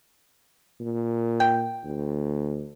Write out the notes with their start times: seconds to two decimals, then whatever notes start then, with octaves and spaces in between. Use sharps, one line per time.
0.80 A#2
1.40 G5
1.84 D2